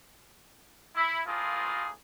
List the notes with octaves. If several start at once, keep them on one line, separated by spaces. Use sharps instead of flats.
E4
A#1 A2 F3 A#3 F4 G#4